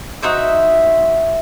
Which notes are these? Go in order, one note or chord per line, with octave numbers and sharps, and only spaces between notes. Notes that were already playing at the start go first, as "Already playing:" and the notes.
D#4 F#4 C5 E5